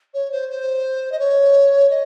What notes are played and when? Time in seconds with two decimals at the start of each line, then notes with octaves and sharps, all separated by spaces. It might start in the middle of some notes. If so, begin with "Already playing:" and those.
0.14 C#5
0.32 C5
0.49 C5
1.12 D#5
1.19 C#5
1.90 D#5